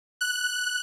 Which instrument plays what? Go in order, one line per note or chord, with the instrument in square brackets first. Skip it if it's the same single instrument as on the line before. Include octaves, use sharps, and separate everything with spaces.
[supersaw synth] F#6